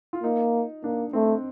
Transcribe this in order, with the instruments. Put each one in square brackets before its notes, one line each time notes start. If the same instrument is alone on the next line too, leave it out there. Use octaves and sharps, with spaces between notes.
[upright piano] F4
[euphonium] A#3 [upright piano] D#4
[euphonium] A#3 [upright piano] D4
[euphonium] A3 [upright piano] C4